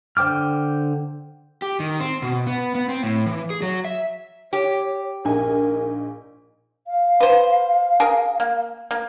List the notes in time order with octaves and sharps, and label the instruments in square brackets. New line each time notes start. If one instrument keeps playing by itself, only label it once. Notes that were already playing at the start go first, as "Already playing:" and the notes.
[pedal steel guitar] D3 C5 G5 D6 F6
[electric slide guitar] G4
D#3
C4
B2
B3
B3
C4
A2
E3
G#4
F#3
E5
[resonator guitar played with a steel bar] G4 [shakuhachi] C#5
[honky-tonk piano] A#1 D#4 G#5 [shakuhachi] A#4
[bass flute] F5
[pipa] B4 C5
G#4 A#4
A#3
A#3